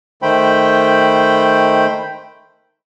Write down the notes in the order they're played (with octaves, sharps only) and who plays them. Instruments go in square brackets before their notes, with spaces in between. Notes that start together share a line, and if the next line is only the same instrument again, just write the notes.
[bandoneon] D#3 A3 C5 G5 B5